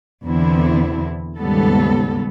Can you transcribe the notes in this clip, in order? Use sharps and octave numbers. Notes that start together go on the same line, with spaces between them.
E2 B2 D3 B3 C4 E4
D#2 G#2 C#3 G3 B3 A4